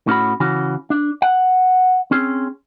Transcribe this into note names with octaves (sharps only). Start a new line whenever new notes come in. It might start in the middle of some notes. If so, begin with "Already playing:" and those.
A2 C#4 F#4 B5
C#3 E3 C#4 F#4
D4
F#5
C4 C#4 G#4